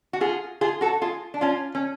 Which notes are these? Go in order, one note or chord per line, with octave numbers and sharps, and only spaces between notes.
F#4
F4 G#4
F4 G#4
F#4 A4
F4 G#4
D4
C#4 F4
C#4